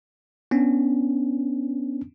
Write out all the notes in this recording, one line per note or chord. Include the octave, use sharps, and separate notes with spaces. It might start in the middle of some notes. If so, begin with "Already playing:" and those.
B3 C#4 D4